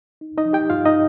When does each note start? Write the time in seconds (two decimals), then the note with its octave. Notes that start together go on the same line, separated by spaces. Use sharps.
0.21 D#4
0.37 D#4 D#5
0.45 F3
0.53 G4 G5
0.70 G2 F4 F5
0.85 D#4 D#5